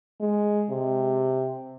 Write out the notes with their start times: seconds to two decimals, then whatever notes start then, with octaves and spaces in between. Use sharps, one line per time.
0.21 G#3
0.70 C3